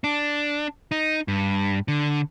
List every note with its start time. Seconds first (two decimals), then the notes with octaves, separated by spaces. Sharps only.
0.04 D4
0.91 D#4
1.28 G2
1.88 D3